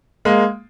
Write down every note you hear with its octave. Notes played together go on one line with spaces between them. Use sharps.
G#3 A#3